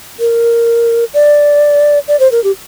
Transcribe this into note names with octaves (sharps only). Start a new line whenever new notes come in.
A#4
D5
D5
C5
A#4
G4